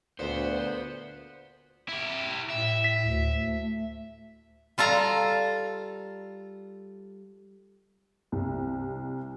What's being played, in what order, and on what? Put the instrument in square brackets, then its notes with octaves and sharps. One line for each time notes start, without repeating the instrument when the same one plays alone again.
[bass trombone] D2 [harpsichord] A#2 [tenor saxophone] B3 [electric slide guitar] C5
[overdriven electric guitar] E4 G4
[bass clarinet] A2 [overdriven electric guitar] E5
[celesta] B6
[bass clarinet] D2
A3
[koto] G3 F4 A4 A#5
[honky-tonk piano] C2